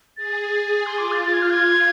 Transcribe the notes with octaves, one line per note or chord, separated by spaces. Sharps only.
G#4 A6
G#4
C6
F4 D6
A6
A6
G#6
F4 F6
G#6